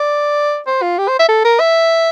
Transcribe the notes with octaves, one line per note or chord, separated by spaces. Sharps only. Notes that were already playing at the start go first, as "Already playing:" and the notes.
Already playing: D5
C5
F4
G4
C5
E5
A4
A#4
E5